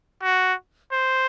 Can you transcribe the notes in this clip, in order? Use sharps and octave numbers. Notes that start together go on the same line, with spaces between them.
F#4
C5